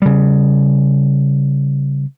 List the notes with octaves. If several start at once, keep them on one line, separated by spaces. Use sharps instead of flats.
C#3 G3